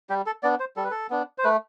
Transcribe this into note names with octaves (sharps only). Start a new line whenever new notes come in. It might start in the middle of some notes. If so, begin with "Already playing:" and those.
G3 G4
A4
B3 D4 D5
C5
G3 A4
B4
A4
B3 D4
C5
A3 B4